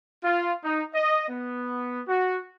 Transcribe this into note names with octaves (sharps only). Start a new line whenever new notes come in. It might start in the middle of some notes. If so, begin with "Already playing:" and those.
F4
D#4
D#5
B3
F#4